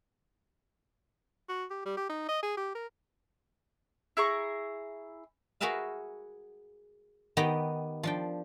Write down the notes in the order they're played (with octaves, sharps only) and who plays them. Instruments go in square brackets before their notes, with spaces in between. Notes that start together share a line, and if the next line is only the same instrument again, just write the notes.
[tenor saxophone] F#4
G4
G3
G4
D#4
D#5
G#4
G4
A#4
[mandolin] E4 G#4 A#5 C#6
[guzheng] F#4 G#4 A#4 B4 E5 F5
D#3 B3 G4 D#5 G5 A#5
F3 D4 G5